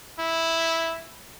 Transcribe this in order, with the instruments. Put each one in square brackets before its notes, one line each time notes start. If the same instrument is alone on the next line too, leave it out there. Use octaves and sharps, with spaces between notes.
[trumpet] E4